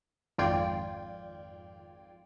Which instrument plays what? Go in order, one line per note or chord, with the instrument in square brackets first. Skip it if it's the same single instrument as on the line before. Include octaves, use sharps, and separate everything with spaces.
[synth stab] G#1 F2 F4 D5 G5 G#6